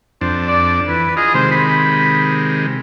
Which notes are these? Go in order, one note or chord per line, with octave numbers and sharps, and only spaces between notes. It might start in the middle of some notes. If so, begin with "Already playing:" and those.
F2 D4 C5
D5
E3 B4
F4 G#4 D#5
C3 D#3 G#3 C5
B5